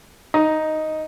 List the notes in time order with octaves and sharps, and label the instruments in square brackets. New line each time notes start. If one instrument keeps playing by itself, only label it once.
[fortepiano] D#4